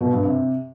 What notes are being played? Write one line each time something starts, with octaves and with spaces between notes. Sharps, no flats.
B2
G2
C3